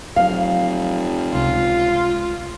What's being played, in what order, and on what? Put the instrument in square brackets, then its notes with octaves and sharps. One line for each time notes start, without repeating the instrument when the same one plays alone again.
[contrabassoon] F1 [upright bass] F#3 [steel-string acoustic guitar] F5
[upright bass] C#2 C3 [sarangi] F4